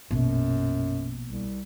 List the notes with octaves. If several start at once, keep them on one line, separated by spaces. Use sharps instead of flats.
A#1 F#2 B2
C2